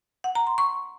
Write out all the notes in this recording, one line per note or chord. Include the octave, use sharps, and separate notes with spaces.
F#5
A#5
C6
C#6